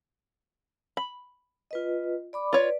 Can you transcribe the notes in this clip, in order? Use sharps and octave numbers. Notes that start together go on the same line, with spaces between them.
B5
F4 B4 D#5
D5 B5 D6
F4 B4 C#5 D5